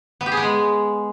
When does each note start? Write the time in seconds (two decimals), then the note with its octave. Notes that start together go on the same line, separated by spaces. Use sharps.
0.21 B3
0.26 G4
0.32 G#4
0.37 B3
0.43 G#3